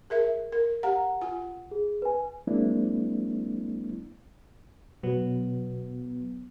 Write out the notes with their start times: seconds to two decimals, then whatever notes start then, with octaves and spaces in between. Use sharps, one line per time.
0.10 G#4 A#4 E5
0.52 A#4
0.83 G4 F5 F#5 A#5
1.21 F4 G#5
1.71 G#4
2.02 B4 G#5
2.47 F#3 G#3 A#3 C4 D4 E4
5.03 B2 F#3 B3